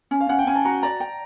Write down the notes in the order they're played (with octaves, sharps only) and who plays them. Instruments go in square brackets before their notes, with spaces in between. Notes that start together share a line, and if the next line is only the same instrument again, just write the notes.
[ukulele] C#4
[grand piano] F5
[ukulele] C#4 [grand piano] F#5
[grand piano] G5
[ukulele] C#4 [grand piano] G#5
[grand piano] A5
[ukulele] F#4 [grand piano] A#5
[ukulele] D5 [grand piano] A#5
[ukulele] G5